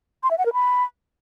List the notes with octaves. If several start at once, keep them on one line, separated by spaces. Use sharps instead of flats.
C6
E5
F#5
A#4
B5